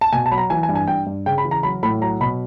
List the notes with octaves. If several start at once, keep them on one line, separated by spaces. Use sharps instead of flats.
A5
B2 G#5
A5
F#3 B5
A#5
E3 G#5
G#5
G2
G#5
G2 G5
G2
C#3 G5
B5
E3
A#5
F#3 B5
A2 B5
F#3 A#5
B2 B5